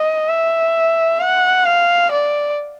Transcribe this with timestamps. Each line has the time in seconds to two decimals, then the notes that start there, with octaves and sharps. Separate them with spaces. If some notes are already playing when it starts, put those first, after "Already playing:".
Already playing: D#5
0.28 E5
1.20 F#5
1.65 F5
2.11 D5